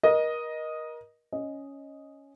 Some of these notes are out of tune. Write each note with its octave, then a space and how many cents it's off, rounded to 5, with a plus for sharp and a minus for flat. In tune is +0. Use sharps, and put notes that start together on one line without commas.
A#4 +30 D#5 +0
C#4 +0 D#5 +0